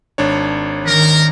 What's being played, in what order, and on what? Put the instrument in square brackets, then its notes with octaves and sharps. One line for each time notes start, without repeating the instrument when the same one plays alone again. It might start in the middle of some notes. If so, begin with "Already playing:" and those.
[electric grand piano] G#1 D4 C#5
[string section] D#3 [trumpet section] A#4